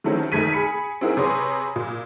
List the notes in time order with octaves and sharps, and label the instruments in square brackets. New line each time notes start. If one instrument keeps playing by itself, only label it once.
[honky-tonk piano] D#3 E3 F#3 A3 C4 C#4
F1 D#3 A3 G#6 B6 D#7
G#4 B5 C#7
C4 D#4 E4 F#4 G#4 A#4
C3 G#4 B4 C#5 C6 D#6
A#2